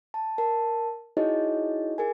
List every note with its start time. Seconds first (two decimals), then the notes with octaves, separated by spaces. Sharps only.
0.14 A5
0.38 A#4 A5
1.17 D#4 E4 F#4 G#4 C#5 D#5
1.98 G#4 A#4 G#5